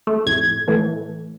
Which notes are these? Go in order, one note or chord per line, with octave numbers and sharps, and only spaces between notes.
A3
G1 F2 A2 G#6
A2 E3 A3